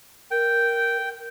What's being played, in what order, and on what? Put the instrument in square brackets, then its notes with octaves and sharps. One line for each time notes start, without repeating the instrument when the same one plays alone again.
[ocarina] A#4 [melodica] G5